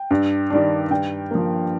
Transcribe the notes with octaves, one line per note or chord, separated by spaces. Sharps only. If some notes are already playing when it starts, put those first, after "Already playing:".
Already playing: G5
G2
D#3 G3 D4
G2 G5
F3 A#3